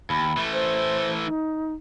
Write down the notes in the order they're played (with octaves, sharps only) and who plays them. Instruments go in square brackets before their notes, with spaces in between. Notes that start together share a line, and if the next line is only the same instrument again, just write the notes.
[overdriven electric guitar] D#2 [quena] B5
[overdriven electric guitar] E3 A3
[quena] C5
D#4